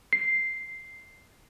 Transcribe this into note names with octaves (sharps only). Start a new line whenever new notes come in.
C7